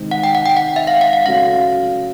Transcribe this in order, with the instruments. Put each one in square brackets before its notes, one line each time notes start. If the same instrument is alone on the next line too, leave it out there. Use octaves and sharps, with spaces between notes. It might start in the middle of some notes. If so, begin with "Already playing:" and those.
Already playing: [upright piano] C3 D#3 G#3 C4
[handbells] F#5
G5
F#5
G5
F#5
E5
F5
F#5
F#5
[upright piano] C#3 F#3 A3 C#4 [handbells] F5